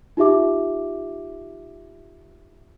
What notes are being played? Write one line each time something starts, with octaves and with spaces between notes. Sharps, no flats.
D#4 F4 G4 E5 D6